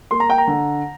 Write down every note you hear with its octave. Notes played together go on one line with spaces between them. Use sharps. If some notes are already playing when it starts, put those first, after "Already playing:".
A#3 C6
A#5
G5
A#5
D3